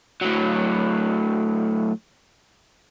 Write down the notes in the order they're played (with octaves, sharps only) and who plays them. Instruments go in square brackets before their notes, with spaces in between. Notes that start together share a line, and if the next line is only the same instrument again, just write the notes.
[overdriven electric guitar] A2 F#3